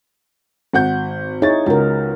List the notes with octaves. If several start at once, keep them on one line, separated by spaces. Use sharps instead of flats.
G#1 F#5 G6
D#4 E4 G#4 C#5 A6
C#2 F#4 A#4